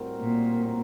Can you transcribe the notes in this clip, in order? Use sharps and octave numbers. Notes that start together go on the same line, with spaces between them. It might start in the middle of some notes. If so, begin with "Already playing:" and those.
Already playing: A2 G3 C4 F#4 A#4
A#2